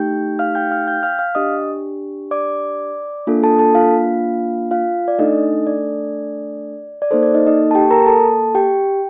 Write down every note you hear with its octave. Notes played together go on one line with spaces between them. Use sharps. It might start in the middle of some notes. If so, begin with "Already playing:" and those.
Already playing: A3 D#4 G4 G5 G6
F5 F6
G5 G6
F5 F6
G5 G6
F5 F6
F5 F6
D4 G4 D#5 D#6
D5 D6
A#3 D4 F4 A4
A4 A5
A4 A5
F4 F5
F4 F5
D5
A3 D4 D#4 A4 D#5
D5
D5
A#3 D#4 A4 C5
D5
D#4 D#5
D#4 D#5
A5
G4 G5
A#4 A#5
A4 A5
G4 G5